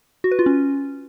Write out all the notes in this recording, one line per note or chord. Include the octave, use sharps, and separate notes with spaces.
F#4
B4
F4
C#4